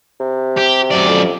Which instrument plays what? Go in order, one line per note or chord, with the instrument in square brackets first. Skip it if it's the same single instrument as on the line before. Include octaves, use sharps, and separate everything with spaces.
[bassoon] C3
[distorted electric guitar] G4
F#2 D5
[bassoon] F2